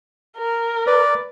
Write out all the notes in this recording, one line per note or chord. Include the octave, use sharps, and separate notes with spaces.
A#4
B4 D5